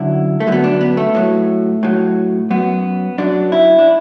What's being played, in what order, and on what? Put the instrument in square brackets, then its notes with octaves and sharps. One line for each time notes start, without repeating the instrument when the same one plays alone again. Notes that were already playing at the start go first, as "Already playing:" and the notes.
Already playing: [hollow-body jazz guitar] F#2 D3 F#3 E4
A3
F#2 D3 F#3 B3
D4
B3
A3
A2 F#3
A2 F#3
F#2 F#3 B3
F#2 F#3 D4
E4
D4